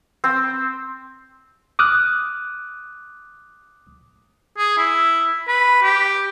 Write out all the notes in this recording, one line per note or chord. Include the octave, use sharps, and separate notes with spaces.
C4
D6 D#6 F6 F#6
G#4
E4
B4
G4